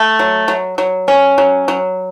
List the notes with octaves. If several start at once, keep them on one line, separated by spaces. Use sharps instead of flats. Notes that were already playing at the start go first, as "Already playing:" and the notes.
Already playing: A3
F#3
F#3
F#3
C#4
F#3
F#3